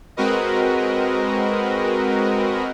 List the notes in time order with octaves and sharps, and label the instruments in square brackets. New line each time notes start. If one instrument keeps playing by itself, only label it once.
[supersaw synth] G#3 C4 F#4 A#4 B4 D#5